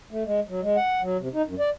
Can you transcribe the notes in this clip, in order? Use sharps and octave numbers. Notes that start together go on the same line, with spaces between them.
A3
G#3
F#3
G#3
F#5
F#3
C3
D#4
F#2
D5